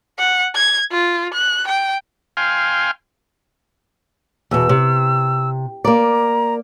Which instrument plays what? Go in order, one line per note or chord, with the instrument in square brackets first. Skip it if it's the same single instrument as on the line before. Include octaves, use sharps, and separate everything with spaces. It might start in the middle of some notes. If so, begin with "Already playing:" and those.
[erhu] F#5
G#6
F4
F#6
G5
[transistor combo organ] F5 G5 G#5 C6 F6
[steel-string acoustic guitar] E2 B2 [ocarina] E6
[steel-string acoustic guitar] C3
[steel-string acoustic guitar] A#3 D5 [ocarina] A#5